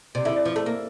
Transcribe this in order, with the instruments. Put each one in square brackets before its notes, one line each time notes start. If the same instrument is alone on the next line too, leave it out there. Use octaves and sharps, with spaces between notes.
[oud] C3 [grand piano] D5
[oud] D3 [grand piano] E4 E5
[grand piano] D5
[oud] F3
A3
A#3